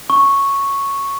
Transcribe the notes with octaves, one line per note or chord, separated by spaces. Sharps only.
C#6